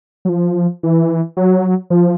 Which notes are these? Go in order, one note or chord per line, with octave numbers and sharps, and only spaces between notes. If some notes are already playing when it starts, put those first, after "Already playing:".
F#3
F3
E3
F#3
F3